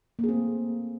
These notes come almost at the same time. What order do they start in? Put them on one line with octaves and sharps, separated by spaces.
A#3 G#4 C4 A3